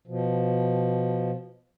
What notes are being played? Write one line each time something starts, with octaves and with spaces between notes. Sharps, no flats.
B2 F3